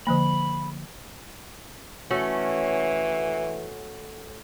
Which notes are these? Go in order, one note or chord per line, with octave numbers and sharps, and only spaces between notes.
D3 F3 A#3 B5
E3 A3 C#4 F#4